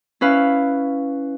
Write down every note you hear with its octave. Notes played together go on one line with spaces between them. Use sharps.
C#4 E4 B4 F5